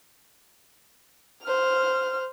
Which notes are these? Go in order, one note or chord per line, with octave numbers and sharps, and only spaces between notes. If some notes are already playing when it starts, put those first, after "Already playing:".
C5 F6